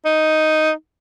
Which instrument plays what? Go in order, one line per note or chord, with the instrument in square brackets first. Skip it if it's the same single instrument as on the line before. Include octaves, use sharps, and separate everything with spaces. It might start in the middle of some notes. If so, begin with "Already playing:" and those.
[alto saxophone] D#4